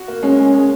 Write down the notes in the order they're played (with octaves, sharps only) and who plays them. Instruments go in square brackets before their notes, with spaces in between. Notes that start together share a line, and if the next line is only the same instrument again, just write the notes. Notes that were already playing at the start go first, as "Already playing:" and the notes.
Already playing: [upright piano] F#4
A#3
[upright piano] G#3 [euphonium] C#4
[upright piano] G#3
G#3